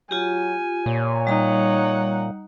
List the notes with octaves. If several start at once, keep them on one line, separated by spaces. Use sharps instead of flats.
F#3 F4 G4 G#5
A#2 C#5
G3 D#4 F#5 A#5